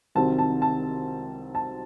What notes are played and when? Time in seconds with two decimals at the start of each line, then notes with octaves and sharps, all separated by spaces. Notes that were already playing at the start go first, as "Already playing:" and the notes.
0.15 C2 C3 D#3 F#3 C4 A5
0.39 A5
0.62 A5
1.55 A5